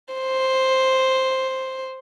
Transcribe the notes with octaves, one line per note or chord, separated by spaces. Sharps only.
C5